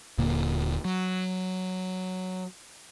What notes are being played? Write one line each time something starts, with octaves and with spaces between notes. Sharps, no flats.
D#1 A#2 D3 A#3
F#3